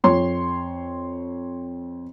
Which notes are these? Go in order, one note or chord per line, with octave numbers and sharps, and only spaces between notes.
F2 C#5 C6